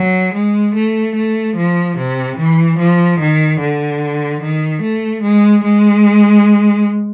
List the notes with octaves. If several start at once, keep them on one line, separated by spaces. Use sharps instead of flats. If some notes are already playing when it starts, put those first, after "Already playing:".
Already playing: F#3
G#3
A3
A3
F3
C3
E3
F3
D#3
D3
D#3
A3
G#3
G#3